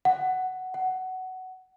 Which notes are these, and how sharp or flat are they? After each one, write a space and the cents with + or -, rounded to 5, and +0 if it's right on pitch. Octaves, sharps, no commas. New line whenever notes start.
F#5 +5
F#5 +15